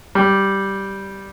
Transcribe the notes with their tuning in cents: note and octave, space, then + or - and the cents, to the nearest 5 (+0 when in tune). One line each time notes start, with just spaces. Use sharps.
G3 -5